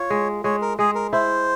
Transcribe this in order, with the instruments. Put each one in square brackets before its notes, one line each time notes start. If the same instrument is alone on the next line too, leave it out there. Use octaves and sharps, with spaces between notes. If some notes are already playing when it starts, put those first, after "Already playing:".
Already playing: [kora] F4 [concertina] C#5
[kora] G#3
[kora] G#3 [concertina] C#5
[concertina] A#4
[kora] G#3 [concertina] G#4
[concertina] A#4
[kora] E4 [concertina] C5